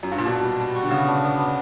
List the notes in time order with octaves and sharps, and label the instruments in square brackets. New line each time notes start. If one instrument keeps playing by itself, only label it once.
[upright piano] F#2
G2
A#2
[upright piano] B2 [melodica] D4
[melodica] G3
G3
F#4
[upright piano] D3
[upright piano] C#3 [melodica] B3
[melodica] D4
B3
B3